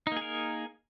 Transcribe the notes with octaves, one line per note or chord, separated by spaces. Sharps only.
A#3 D#4 G#4 A#4